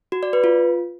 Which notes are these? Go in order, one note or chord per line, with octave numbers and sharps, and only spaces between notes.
F#4
D5
B4
F4